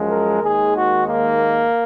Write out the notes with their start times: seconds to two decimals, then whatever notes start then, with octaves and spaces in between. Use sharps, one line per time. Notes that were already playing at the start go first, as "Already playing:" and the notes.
Already playing: F#2 F3 G#3
0.09 A#4
0.42 D#2 D#3 G#3 G#4
0.75 F#4
1.07 A#3